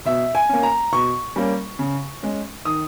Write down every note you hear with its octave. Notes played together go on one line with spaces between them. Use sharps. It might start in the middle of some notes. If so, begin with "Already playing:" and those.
B2 E5
G#5
A#3 C#4
A#5
B2 C#6
G3 A#3 C#4
C#3
G#3 C#4
D#3 D#6